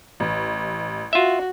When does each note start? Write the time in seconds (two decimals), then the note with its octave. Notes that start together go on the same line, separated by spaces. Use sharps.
0.20 A1
1.13 F4 F#4 E5